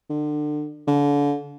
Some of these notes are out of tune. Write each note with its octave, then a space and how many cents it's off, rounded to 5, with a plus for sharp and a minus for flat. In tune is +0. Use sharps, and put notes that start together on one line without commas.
D3 +30
D3 -35